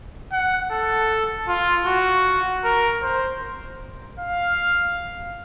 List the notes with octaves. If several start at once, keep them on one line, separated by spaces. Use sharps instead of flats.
F#5
A4
F4
F#4
A#4
C5
F5